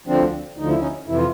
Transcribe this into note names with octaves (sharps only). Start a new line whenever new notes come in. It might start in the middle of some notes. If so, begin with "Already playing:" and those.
D2 D3 F3 C4 D4
D2 D3 F3 D#4
E4
C#4 D#4
F2 C3 E3 E4
F4